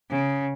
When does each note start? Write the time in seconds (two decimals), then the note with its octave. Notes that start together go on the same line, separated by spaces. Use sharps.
0.10 C#3